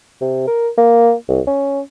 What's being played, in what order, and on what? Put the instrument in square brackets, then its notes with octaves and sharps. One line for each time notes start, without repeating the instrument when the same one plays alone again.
[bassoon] C3
A#4
A#3
C2
C#4